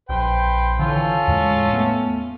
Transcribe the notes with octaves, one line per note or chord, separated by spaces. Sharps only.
A#1 B4 C5 G5
D3 E3 C#4 F4 A4
E2 A2 G#3
A3 B3